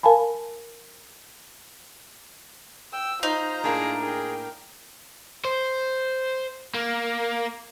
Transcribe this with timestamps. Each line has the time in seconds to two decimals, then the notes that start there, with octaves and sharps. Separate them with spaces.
0.03 A#4 F5 G#5 A5 B5
2.93 G5 E6
3.23 D#4 F4 C5 A#5
3.64 A2 A#3 D4 G#4
4.02 G#4 A#4 G5
5.45 C5
6.74 A#3